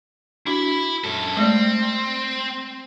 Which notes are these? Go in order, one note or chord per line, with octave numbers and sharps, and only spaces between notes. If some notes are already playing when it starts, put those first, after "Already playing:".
D4 E4 F#4 B5
F#2 A4
G#3 A3 C4 D5